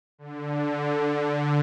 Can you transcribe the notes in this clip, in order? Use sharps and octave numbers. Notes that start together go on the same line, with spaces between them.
D3